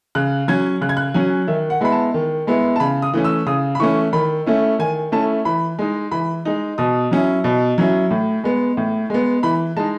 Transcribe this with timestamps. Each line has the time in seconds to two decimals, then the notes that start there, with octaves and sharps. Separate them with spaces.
0.15 C#3 F#6
0.48 F#3 C#4 G#6
0.81 C#3 F#6
0.89 G#6
0.97 F#6
1.14 F#3 C#4 G#5
1.47 D#3 E5
1.70 F#5
1.81 G#3 B3 E4 B5
1.92 A5
2.14 D#3
2.47 G#3 B3 E4
2.76 A5
2.80 C#3 B5
3.02 D#6
3.13 E3 A3 C#4
3.24 E6
3.46 C#3 D#6
3.75 B5
3.80 E3 A3 C#4 C#6
4.13 D#3 B5
4.46 A3 C#4 E4
4.79 D#3 G#5
5.12 A3 C#4 E4 A5
5.45 E3 B5
5.79 G#3 D#4
6.11 E3 B5
6.45 G#3 D#4
6.78 B2 D#6
7.11 F#3 C#4 E4
7.44 B2
7.78 F#3 C#4 E4
8.11 A2
8.44 G#3 B3
8.77 A2
9.10 G#3 B3
9.43 E3 B5
9.76 G#3 D#4 A5